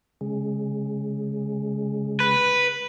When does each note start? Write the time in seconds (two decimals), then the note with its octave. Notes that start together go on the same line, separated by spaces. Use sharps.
0.21 C#3 G#3
2.20 B4